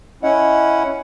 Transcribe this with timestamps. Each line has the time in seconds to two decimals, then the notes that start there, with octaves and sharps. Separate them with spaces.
0.23 C#4 E4 D#5 F#5